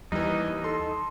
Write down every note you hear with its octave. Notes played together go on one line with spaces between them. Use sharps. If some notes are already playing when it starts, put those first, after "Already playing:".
D#2 E3 G3 D#4
A4 C6